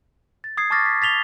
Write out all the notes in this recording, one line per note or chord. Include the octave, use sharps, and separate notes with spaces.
A6
D#6 G#6 C7
A5 C#6 D6 F6 A6 A#6
B6
A6 B6 F7 G7